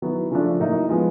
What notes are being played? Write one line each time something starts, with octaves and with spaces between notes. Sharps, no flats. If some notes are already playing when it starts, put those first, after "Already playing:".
D#3 F#3 B3 E4
C#3 F3 A3 D4
A2 F#3 A#3 D#4
F3 G#3 B3